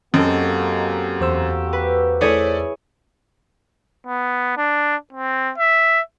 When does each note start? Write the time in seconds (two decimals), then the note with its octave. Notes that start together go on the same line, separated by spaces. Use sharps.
0.14 F#2 A#3 C4 F#4 G4 A4 D#5
1.20 E2 C5 E6
1.73 B4
2.21 A3 E4 G#4 C#5 D5
4.07 B3
4.57 D4
5.13 C4
5.58 E5